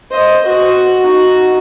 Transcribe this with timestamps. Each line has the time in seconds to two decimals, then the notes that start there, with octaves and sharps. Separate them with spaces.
0.11 C5 D#5
0.46 F#4
1.06 D#4 F#4